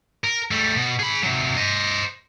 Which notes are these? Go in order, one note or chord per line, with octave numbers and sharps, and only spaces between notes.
A#4
G3 A3
B2
G#4 B5
C3 F#3
C5 D#5